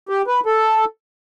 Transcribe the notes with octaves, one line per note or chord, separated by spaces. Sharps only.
G4
B4
A4